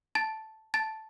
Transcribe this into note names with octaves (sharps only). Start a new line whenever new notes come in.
A5 A6
A5 A6